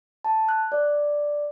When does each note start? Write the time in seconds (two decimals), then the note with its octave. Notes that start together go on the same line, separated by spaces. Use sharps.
0.24 A5
0.49 F#6
0.72 D5